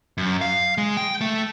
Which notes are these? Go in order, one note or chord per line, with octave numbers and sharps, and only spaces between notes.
F#2
F5
G#3
G5
A3